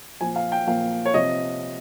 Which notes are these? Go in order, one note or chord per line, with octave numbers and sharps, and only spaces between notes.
A#2 F3 G#5
F5
G5
A#2 F3 F5
C#5
C3 F3 D#5